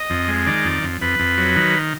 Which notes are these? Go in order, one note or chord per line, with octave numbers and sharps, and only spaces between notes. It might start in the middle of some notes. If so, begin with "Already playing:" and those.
Already playing: D#5
F2
G#3
D#3 D5
F2
F2
F2 B4
F2
F#3
D#3